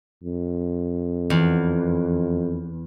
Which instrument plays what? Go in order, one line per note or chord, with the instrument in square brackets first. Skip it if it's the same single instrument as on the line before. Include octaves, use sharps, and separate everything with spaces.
[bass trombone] F2
[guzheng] E2